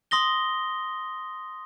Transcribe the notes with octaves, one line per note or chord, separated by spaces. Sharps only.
C6 D#6 A#6 G7